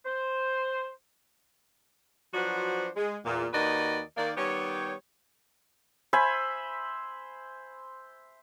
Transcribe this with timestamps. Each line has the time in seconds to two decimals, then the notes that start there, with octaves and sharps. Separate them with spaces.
0.06 C5
2.34 F3 F#3 D4 F#4 B4 C5
2.97 G#3
3.26 E2 A#2
3.53 D#2 D#3 F#4 B4 D5 D#5
4.17 D#3 A#3 D5
4.37 D#3 G3 B3 G4 C#5
6.13 C5 E5 G#5 B5